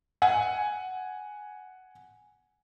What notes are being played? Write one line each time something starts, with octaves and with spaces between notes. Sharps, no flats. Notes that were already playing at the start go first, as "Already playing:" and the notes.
F#5 G#5